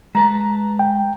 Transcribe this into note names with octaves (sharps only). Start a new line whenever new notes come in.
G#3 B4 A5 A#5
G5